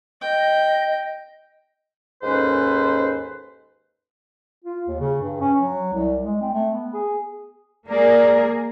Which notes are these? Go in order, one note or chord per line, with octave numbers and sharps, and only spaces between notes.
D#5 G5
D#2 G#2 C#4 A4 B4 C5
F4
D#2
C#3
G2
C#4
F#3
C2
G#3
C4
A3
B3
G#4
A#3 G#4 A#4 D5